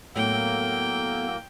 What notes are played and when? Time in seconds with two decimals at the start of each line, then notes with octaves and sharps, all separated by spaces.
0.16 A2 F#3 A#3 B3 A4 G5